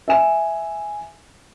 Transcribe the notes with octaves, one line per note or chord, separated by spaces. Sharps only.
E5 G#5 E7